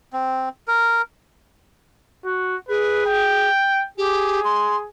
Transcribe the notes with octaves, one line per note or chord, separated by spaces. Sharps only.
C4
A#4
F#4
G#4 B4
G5
G4 G#4
C6